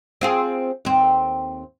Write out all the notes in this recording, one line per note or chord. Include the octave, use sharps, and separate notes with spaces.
C4 F4 G#4
D#2 C4